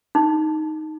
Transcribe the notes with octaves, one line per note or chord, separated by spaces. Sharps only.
D#4